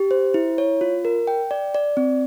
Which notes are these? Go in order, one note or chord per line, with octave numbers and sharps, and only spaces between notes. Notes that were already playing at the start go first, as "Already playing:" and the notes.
Already playing: G4
C5
E4
C#5
F4
A#4
G5
D5
D5
C4